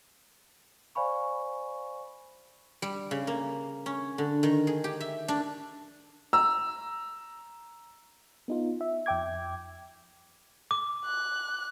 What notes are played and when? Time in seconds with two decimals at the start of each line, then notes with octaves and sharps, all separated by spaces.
0.95 C5 D5 F5 G#5 B5 C#6
2.82 G3
3.11 C#3
3.27 A#3
3.86 C#4
4.18 D3
4.43 D#3
4.67 G#4
4.84 G4
5.00 E5
5.28 D4
6.33 A#5 E6
8.48 B3 D#4 F4
8.81 E5
9.06 F2 E5 G5 D6 G#6
10.71 D6
11.05 F#6